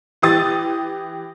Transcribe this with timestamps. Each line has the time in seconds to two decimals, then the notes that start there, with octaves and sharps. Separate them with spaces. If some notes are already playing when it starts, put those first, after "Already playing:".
0.22 E3 G4 D#6 A6